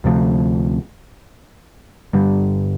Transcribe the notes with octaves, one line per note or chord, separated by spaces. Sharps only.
D2 C3 F3 A3
G1 G2 D3 G3